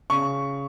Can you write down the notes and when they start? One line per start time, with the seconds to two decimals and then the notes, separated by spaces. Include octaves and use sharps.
0.10 C#3 C#6